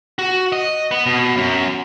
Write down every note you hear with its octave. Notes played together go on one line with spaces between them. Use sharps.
F#4
D#5
B3
B2
F#2